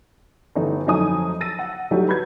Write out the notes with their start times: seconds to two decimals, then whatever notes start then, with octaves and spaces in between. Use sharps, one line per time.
0.56 G1 E3 A3 D#4
0.86 F2 F#3 A3 D#4 G#5 D#6
1.41 E6 A6 A#6 D#7
1.59 F#5
1.91 F#3 G3 A3 D#4 F#4 G4
2.08 B4 B5 G6 G#6